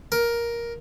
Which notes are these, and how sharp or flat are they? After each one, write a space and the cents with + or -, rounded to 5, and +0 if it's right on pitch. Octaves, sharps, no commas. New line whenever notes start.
A#4 +10